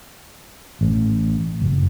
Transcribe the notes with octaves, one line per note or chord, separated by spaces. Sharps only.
A1
F#1